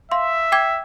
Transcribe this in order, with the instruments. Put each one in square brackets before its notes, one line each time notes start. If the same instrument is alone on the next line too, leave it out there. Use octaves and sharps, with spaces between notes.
[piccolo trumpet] E5 [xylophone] F5 C6
[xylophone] G5 D6 G#6